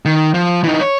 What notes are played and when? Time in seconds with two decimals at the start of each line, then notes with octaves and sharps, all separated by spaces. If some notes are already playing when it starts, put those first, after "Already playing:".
0.05 D#3
0.34 F3
0.64 E3 D#4
0.81 C#5